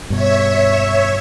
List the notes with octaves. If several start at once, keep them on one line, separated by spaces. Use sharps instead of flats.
G2 B2 C#5 E5